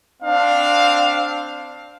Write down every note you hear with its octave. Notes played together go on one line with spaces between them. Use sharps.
C4 D4 F5